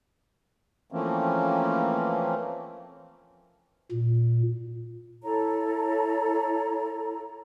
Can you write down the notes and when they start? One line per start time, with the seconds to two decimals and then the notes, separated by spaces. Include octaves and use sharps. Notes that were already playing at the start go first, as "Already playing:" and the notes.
0.92 E3 F3 A3 A#3 C4 C#4
3.91 A#2
5.23 E4 A4 C#5 A#5